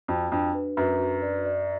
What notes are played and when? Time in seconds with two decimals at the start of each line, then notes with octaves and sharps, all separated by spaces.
0.08 F2 F#4
0.32 F2 D4
0.54 B4
0.77 F#2 B4
1.00 F#4
1.22 D5
1.45 D5